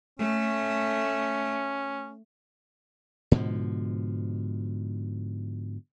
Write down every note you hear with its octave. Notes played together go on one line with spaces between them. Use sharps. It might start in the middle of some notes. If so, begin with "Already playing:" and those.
A3 C#4
G#2 B2 D3 F3